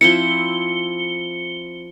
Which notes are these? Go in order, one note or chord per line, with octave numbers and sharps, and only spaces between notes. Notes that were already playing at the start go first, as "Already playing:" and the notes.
F3 C4 E4 C#7 G7